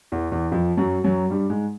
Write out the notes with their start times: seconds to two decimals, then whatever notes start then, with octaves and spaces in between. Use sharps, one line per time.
0.12 E2 E3
0.32 E2 E3
0.52 F2 F3
0.77 F#2 F#3
1.04 F#2 F#3
1.30 G2 G3
1.50 G#2 G#3